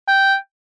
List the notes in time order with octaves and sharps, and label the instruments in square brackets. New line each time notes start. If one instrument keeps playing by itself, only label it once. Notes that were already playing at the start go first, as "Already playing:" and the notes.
[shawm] G5